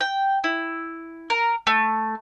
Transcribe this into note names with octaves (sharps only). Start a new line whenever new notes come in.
G5
E4
A#4
A3